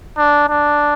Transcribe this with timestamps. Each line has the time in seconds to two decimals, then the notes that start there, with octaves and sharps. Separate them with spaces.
0.17 D4
0.49 D4